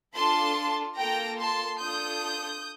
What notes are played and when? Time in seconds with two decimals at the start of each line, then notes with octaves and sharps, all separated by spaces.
0.14 D4 F4 A4 A5 C6
0.96 A#3 F4 A4 G5 A#5
1.38 A5 C6
1.79 D4 F4 A4 D#6 G6